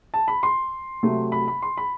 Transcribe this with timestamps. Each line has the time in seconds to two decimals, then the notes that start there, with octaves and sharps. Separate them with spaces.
0.14 A5
0.28 B5
0.43 C6
1.03 C3 F#3 A3
1.32 B5
1.48 B5
1.62 C6
1.77 B5